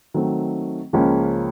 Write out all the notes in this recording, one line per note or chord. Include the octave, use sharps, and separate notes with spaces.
D#3 F#3 A3 C4
C#2 C#3 F3 A#3 C#4